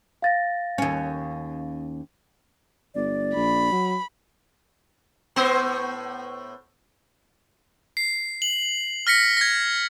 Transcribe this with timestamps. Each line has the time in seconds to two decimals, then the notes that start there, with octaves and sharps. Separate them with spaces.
0.22 F5 A6 A#6
0.78 D#2 C#4
2.95 G1 D5
3.35 A#1 B5
3.72 F#3
5.36 A2 B3 C5
7.97 C7
8.42 F#7
9.07 F6 A#6 B6 C#7
9.37 G#6 A#6